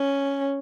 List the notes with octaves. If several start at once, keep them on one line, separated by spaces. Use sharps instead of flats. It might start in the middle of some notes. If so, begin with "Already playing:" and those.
Already playing: C#4